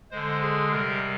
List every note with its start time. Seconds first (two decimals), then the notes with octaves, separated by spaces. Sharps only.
0.11 D3 G#3 C5
0.41 G#4
0.71 C3 G3 A#4